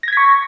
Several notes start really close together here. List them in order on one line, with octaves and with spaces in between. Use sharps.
A#6 G#6 B6 C#6